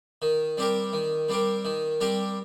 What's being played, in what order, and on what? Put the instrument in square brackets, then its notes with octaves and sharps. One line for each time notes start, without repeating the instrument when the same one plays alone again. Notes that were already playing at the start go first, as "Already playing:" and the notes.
[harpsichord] D#3
G3 C4 G4 A#4
D#3
G3 C4 G4 A#4
D#3
G3 C4 G4 A#4